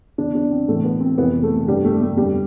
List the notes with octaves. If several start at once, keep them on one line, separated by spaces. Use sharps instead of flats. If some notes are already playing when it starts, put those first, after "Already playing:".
E2 D3 D4
D4
C4
A2 E3 A3
B3
C4
F2 C3 E3 B3
A3
G2 D3 G3
A3
A3
F2 D3 G3